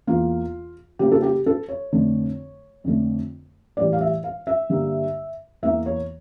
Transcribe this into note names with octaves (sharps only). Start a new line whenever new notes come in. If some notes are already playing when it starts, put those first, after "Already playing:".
E2 E3 A#3 F4
C#3 G3 A#3 G4
A4
G4
A4
C#5
F2 D3 A3
F2 D3 A3
A2 E3 G3 D5
F5
E5
F5
E5
G2 D3 G3 A#3
E2 E3 A#3 E5
C#5